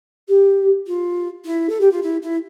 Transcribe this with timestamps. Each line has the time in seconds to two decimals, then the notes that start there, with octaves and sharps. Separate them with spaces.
0.28 G4
0.86 F4
1.44 E4
1.69 A4
1.80 G4
1.91 F4
2.02 E4
2.22 E4